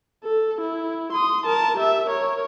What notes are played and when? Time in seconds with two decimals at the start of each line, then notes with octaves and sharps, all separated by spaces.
0.24 A4
0.61 E4
1.12 C6 D#6
1.46 A#4 A5
1.77 G4 E5
2.06 A#4 C#5